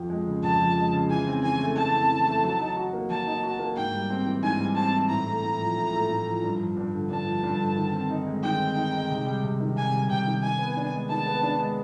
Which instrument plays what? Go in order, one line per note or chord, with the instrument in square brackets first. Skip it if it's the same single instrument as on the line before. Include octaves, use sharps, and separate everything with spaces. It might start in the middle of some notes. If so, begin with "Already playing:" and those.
Already playing: [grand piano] F2 F3
G#3
C#3
[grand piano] F2 [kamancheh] A5
[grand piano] F3
G#3
C#3
[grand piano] E3 [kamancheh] G#5
[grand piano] C4
[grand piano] E3 [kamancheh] G#5
[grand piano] A3
[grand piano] E3 [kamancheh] A5
[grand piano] C4
E3
A3
F#3
D#4
F#4
A#3
[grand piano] F#3 [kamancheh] A5
[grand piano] D#4
F#4
A#3
[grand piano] G#2 [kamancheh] G5
[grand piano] G3
C4
E3
[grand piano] G#2 [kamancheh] G#5
[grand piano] G3
[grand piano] C4 [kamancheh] A5
[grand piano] E3
[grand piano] A2 [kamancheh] A#5
[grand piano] A3
A2
F3
A2
A3
A2
F3
G2
F3
G2
D3
[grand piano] G2 [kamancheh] A5
[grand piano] F3
G2
D3
D#3
C4
D#4
G#3
[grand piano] D#3 [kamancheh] G5
[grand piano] C4
D#4
G#3
C3
G3
C3
D#3
[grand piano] C3 [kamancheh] G#5
[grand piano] G3
[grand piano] C3 [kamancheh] G5
[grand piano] D#3
[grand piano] D#3 [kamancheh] G#5
[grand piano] B3
D4
G#3
[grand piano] D#3 [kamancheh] A5
[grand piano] B3
D4
G#3